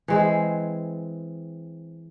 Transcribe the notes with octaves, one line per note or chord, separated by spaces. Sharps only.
E3 G#3 C4